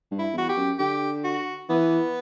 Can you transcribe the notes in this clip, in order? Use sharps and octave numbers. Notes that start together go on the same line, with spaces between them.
G2
E4
E2 F#4
G4
F#2
D3 G4
F#4
E3 B3